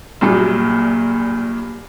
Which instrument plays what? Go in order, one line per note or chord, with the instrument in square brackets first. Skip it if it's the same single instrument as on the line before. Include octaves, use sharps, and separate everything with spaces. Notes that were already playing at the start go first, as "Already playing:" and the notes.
[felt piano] A#1 G2 A#2 F#3